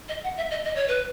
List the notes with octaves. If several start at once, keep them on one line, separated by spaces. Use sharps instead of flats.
D#5
F#5
E5
D#5
D#5
C#5
B4